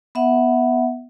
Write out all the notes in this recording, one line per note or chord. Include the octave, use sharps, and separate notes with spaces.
B3 E5 F#5